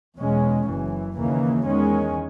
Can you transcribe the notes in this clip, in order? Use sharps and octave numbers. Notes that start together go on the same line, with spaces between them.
E2 B2 G#3 C#4
F#1 F#2 E3
D#2 C#3 E3 A#3
E2 D#3 G#3 C#4